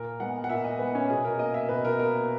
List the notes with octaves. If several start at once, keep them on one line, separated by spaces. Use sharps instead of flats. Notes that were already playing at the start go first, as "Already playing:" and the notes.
Already playing: A#2 A#4
G#3 B3 F#5
F#5
A#2 E5
D#5
G#3 B3 B4
C#4
B2 G#4
A#4
A#3 D#5
E5
B2 B4
A#4
A#3 A#4